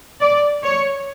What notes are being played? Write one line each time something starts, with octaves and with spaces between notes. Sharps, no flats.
D5
C#5